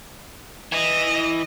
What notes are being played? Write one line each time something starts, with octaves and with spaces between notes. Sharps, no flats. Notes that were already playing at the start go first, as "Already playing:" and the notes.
E3 D#5